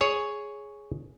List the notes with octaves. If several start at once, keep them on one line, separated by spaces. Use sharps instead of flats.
G#4 C#5